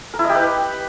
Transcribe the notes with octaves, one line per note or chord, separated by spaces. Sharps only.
A#4
E4
D#5
G4
B4